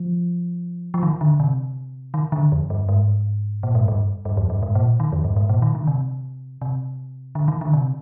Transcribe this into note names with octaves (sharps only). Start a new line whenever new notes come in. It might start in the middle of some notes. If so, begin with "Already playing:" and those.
Already playing: F3
F3
D#3
D3
C3
D#3
D3
F2
G2
G#2
A#2
G#2
G2
G2
F2
G2
G#2
A#2
D#3
F2
G2
G#2
A#2
D#3
D3
C3
C3
D3
D#3
D3
C3